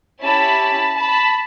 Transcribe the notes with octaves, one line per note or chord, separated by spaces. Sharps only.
C#4 E4 G4 A5 B5
A5 B5